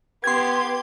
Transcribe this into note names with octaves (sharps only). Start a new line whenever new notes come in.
B3 G4 C6 G#6